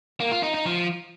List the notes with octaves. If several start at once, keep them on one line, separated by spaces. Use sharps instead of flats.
A#3
F4
D#4
D#4
F3